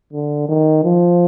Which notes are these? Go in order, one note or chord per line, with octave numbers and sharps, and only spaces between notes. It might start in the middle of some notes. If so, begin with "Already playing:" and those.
D3
D#3
F3